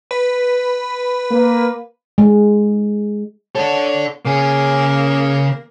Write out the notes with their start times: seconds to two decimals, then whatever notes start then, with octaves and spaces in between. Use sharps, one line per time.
0.11 B4
1.32 A#3
2.18 G#3
3.55 D4 A4 C#5
4.25 C#3 A#3 G#4